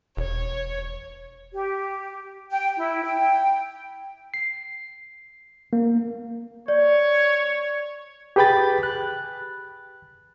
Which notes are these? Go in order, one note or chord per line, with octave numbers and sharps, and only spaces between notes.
E1 C#5
G4
G5
E4
G5
C7
A#3
C#5 D5
G4 G#4 B4 G5 B5 A6
F#6